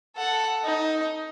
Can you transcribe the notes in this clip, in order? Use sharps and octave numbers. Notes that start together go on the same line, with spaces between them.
A4 F#5
D#4